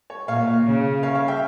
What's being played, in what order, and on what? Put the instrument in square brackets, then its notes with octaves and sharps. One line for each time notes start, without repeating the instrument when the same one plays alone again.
[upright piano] C#5
[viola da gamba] A#2 [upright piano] C#5 F5
[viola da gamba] C#3
[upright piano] C#5 F5
C#5 F5
E5 G5